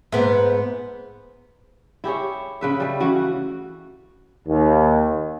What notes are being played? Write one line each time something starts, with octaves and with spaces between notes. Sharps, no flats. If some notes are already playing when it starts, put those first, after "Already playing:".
G#2 B3
E4 G4 G#4 C#5
C#3 B4 E5
G3 A3
C#3 E3 F#4
D#2